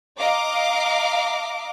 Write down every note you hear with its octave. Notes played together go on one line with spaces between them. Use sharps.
D#5 F5 A#5 D6